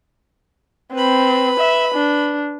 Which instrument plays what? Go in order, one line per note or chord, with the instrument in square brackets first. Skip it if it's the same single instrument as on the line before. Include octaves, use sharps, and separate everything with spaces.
[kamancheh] C4 [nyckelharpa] B4 B5
[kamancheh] E5
D4